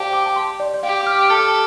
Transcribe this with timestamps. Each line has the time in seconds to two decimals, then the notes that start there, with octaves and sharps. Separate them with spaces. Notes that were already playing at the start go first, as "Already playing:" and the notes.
Already playing: G4 C5 D5 F5 G5 A5
0.13 D6
0.26 A5
0.36 C6
0.60 D5
0.74 D5
0.83 G4 F5
1.01 D6
1.06 F6
1.18 D6
1.28 A4 F6
1.39 D6